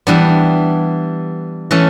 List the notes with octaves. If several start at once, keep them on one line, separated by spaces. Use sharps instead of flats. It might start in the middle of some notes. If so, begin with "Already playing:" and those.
E3 G3 B3 D4
E3 A3 C#4